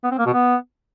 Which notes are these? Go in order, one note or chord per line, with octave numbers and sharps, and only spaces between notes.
B3
C4
A#3
B2
B3